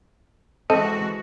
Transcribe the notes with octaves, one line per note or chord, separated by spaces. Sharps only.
E3 G#3 C4 F#4 A4 D#5